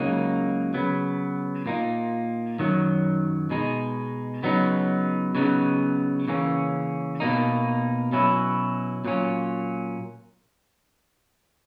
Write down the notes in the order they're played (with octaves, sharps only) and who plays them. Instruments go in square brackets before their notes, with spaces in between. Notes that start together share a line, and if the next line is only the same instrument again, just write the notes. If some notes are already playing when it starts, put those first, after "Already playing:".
Already playing: [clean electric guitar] C#2 C#3 F#3 A#3 D#4
C#3 F#3 B3
A#2 A#3 D#4
F#2 D#3 F#3
B2 G#3 D#4
C#3 F#3 B3 D#4
C#3 F#3 B3 D#4
C#3 E3 A#3 C#4
B2 A#3 D#4
B2 F#3 C#4 E4
A#2 F#3 A#3 C#4